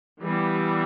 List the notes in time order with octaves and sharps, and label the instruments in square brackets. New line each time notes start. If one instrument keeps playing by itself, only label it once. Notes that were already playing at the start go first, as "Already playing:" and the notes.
[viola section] E3 G3 B3